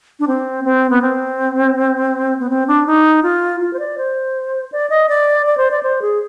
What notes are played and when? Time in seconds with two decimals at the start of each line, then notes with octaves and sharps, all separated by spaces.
0.20 D4
0.27 C4
0.65 C4
0.90 B3
1.02 C4
2.40 B3
2.50 C4
2.67 D4
2.87 D#4
3.23 F4
3.61 F4
3.73 C5
3.79 D5
3.98 C5
4.72 D5
4.90 D#5
5.09 D5
5.46 D5
5.57 C5
5.71 D5
5.83 C5
6.02 G#4